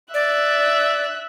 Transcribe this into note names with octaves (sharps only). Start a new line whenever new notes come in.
D5 E5 F#6